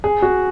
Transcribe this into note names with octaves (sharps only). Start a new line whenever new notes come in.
G#4
F#4